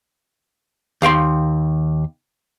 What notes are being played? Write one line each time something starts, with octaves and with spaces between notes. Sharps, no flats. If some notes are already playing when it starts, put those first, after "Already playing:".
D#2 F5 G5 C6